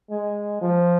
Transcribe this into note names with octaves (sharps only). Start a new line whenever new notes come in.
G#3
F3